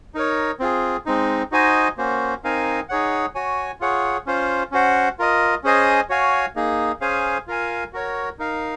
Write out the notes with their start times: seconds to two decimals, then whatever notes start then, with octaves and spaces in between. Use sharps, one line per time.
0.15 D#4 A#4 C#5
0.60 C4 F4 G#4
1.06 G#3 C4 D#4
1.51 D#4 F#4 C5 D#5 G#5
1.97 A#3 C#4 F#4 C5
2.44 C4 D#4 A#4 F5 G#5
2.89 D#4 G#4 C#5 F#5
3.35 F#4 C#5 G#5
3.80 F4 G#4 C#5 F#5
4.26 C#4 F4 C5
4.72 C#4 F#4 C5 F#5
5.19 F4 A#4 D#5
5.63 C#4 G#4 C5 D#5 G#5
6.10 F#4 C#5 F5 G#5
6.56 A#3 D#4 G#4
7.01 C#4 G#4 C5 F5 G#5
7.47 F4 A#4 F5 G#5
7.93 F#4 A#4 C#5
8.39 D#4 A#4 F5